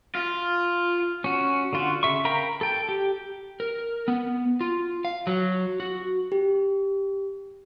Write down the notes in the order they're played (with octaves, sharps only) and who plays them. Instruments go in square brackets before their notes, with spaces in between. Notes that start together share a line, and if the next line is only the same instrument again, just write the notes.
[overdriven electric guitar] F4
[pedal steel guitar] C#4 F#4
D3 F4 F#4
C#3 E5 C#6
A#4 F5 G5 A#5 B5
A4 G5
G4
[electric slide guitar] A#4
B3
F4
F5
F#3
F#4
[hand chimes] G4